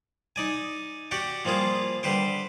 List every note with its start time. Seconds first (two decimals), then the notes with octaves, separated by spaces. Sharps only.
0.36 D#4 D5 G#5
1.11 F#4 G4 D5 F#5 G5
1.45 F3 G3 A#3 F4 G#4
2.03 D3 G3 B4 C5 G5